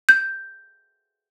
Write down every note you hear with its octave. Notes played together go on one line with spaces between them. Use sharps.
G6